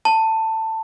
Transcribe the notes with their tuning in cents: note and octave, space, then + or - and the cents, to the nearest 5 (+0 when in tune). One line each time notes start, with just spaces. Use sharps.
A5 +15